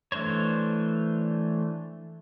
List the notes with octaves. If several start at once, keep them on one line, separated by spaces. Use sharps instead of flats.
E3 A3 D4 C5 C#5